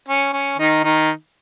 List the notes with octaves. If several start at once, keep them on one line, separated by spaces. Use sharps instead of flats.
C#4
C#4
D#3 D#4
D#3 D#4